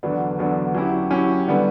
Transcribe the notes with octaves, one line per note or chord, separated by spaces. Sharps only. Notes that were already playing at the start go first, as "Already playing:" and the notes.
E2 D3 F#3 B3 D4
E2 D3 F#3 B3 D4
F#3 C#4 E4 G4
F#3 C#4 E4 G4
D3 G3 B3